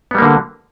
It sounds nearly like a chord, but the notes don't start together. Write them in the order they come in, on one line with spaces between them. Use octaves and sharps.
B3 G3 A#3 D3